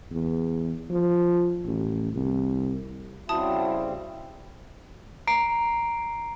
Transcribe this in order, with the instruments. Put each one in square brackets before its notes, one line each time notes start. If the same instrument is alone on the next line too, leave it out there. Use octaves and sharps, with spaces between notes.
[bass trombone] E2
F3
A1
C2
[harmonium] C#3 G3 C4 [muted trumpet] E4 [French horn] F#4 [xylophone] A5 D#6
[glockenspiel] A#5 C7 D7